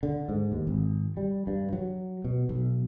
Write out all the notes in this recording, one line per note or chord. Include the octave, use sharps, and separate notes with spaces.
D3
G#2
D#2
G#1
G3
G2
F#3
B2
B1